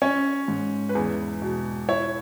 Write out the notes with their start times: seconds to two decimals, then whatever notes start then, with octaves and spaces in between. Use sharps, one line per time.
0.02 C#4 C#5
0.48 G#2
0.89 B4
0.95 E2 G#4
1.42 B2
1.89 E4 C#5